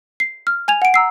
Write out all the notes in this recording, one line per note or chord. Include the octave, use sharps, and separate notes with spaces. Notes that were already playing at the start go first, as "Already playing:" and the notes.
C7
F6
G#5 G#6 F7
F#5 D7
A#5 E6 C7